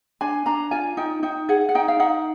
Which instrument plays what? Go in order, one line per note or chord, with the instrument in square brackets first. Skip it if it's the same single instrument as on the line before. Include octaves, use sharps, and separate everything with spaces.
[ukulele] D4 G#5
D4 A#5
F4 G#5
D#4 G5
D#4 G5
G#4 F#5
F#5
D#4 G5
F5
D#4 F#5